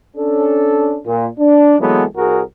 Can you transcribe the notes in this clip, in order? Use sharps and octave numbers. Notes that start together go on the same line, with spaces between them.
C#4 D4 A4
A#2
D4
E3 F#3 G#3 A#3 B3 A4
C2 F#4 G#4 A#4